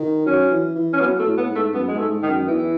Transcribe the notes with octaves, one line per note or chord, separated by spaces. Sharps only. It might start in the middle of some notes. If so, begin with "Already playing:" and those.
Already playing: D#3
F#3 C#4
E3
E3
C#4
F#3 B3
A3
A2
B3
G#2
A3
F#2 B3
G#2 G#3
A3
G#2
D#3
F#2
E2 E3